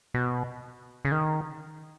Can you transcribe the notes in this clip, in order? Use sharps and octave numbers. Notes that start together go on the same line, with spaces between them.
B2
C#3
D#3